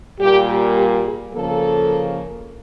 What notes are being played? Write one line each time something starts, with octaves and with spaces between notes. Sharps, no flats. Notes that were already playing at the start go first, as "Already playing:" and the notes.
A#2 G3 A#3 G4
G4
G#4
C#3 F3 A#3 A4